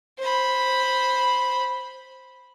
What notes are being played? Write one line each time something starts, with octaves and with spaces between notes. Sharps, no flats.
C5 B5